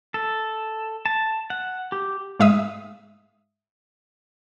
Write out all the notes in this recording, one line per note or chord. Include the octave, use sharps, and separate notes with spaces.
A4
A5
F#5
G4
G#2 G#3 E5 F5 D#6